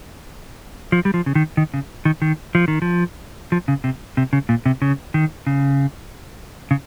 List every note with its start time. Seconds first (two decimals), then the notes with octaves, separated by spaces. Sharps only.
0.92 F3
1.05 G3
1.14 F3
1.26 C#3
1.35 D#3
1.57 D#3
1.74 C#3
2.05 D#3
2.22 D#3
2.55 F3
2.68 D#3
2.82 F3
3.52 F3
3.68 C#3
3.84 C3
4.17 C3
4.33 C#3
4.49 A#2
4.66 C3
4.82 C#3
5.14 D#3
5.47 C#3
6.71 C#3